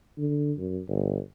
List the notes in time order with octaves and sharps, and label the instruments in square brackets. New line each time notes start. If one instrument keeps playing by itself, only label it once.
[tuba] D3
F#2
G1